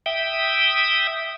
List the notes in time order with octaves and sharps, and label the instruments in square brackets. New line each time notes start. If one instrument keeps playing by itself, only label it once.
[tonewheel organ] E5 G5 D#6